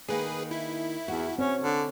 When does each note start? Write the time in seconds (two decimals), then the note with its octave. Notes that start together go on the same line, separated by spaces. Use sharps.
0.09 D#3 A#3 G#4 B4
0.51 E4
1.08 E2 F#4
1.38 C4 C#4 C#5
1.62 D3